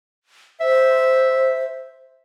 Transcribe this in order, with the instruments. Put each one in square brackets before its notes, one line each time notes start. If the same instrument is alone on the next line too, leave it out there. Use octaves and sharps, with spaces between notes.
[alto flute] C5 [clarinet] E5